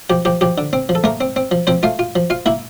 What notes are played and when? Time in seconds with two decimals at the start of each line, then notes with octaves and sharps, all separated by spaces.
0.10 F3 G4
0.25 F3 G4
0.41 F3 G4
0.58 D3
0.73 C4
0.89 F3
0.95 A4
1.04 A3 A#3 A#4
1.21 C4
1.36 C4
1.51 F3
1.67 F3 C4 C5
1.83 A3 F4 F5
1.99 F4
2.15 F3
2.30 F4 F5
2.46 A#3 E4 E5